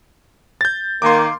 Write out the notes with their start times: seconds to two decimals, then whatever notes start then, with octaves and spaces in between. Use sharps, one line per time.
0.61 G6 A6
1.02 D#3 A#3 C6 D6